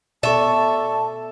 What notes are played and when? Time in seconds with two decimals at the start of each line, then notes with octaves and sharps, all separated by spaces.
0.23 B2 A4 D5 E5 A5 C#6